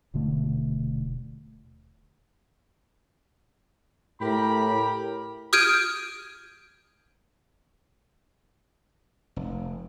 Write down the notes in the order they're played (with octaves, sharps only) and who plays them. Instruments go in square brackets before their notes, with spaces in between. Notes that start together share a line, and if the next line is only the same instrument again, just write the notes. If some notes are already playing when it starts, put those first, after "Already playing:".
[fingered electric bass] D#1 B2 D3 A3
[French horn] A2 [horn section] G4 A#4 B5
[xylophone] D#6 F6 G6 G#6 D7 D#7
[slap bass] F1